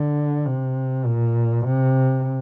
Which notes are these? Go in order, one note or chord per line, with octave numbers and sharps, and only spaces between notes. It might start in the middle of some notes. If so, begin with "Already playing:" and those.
Already playing: D3
C3
A#2
C3